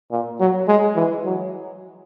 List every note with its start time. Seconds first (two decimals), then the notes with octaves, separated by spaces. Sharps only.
0.11 A#2
0.39 F#3
0.67 G#3
0.95 E3
1.25 F#3